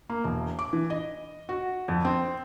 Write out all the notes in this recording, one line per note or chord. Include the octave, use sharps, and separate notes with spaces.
A#3
E1
D6
E3
D#5
F#4
F2
C4